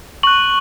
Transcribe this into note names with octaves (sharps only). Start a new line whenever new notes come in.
C#6 F#6 F#7